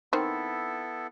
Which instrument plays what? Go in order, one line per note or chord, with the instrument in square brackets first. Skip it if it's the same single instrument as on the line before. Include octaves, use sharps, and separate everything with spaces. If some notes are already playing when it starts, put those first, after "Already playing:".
[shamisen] D#3 C4 [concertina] B3 E4 A4